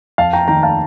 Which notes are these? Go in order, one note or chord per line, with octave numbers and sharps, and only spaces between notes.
F2 F5 A5
G5 A#5
D#3 G5 A#5
F5 A5